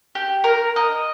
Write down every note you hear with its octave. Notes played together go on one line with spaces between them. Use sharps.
G4
A#4
D#5